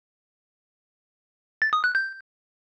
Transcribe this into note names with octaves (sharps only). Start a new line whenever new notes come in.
A6
D#6
F#6
G6